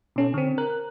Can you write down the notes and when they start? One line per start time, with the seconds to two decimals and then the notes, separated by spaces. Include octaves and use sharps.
0.16 B2 C#4 A4
0.34 D3 C4
0.58 A#4 F#6